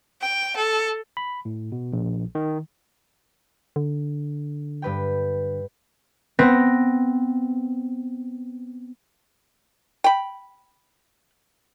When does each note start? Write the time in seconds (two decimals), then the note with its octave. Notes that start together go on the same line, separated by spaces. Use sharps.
0.21 G5
0.56 A4
1.17 B5
1.45 A2
1.72 B2
1.93 A#1
2.35 D#3
3.76 D3
4.82 G2 B4 G5
6.39 B3 C4 A#6
10.04 G5 B5